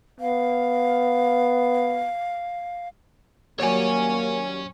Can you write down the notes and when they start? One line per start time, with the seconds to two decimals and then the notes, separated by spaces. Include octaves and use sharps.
0.20 B3 F5
3.60 D#2 F#3 G3 A#3 C#5 G#5